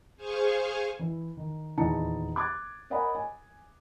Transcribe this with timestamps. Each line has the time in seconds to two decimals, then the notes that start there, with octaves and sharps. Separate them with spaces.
0.16 G#4 C5 F5 G#5 C#6
0.99 E3 E4
1.37 D#3
1.77 D#1 E2 D#4 E4 A5 C#7
2.36 D6 F#6 G#6 A6
2.90 A#4 C#5 D#5 F#5 G#5 B5
3.15 G#5